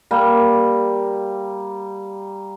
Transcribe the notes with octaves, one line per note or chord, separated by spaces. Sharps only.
G3 A#3